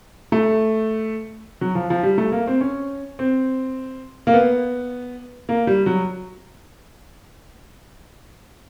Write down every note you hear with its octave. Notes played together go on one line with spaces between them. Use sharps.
A3
F#3
F3
F3
G3
A3
A#3
C4
C#4
C4
A#3
B3
A#3
G3
F#3